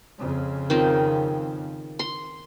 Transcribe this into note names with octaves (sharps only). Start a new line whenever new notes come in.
F2 C#3
D#3 C4 F4
C6